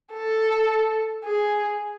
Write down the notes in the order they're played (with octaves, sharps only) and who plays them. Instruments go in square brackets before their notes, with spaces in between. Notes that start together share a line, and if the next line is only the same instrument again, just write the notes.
[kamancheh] A4
G#4